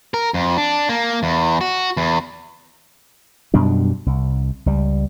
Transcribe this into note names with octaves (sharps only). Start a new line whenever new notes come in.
A#4
F2
D4
A#3
E2
F#4
E2
F#2 B2 G3 D4
C2
C#2 G3